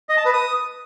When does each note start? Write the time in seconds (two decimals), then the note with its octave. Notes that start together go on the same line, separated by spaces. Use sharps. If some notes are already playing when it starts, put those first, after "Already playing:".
0.09 D#5
0.17 A5
0.25 B4
0.34 D#6